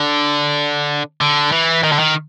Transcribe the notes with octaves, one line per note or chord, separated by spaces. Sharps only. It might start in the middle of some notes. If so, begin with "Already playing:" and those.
Already playing: D3
D3
E3
D#3
D3
D#3